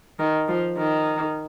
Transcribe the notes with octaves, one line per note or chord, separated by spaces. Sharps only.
D#3
F3
D#3